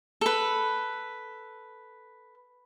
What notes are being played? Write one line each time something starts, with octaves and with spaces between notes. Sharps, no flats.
A4 B4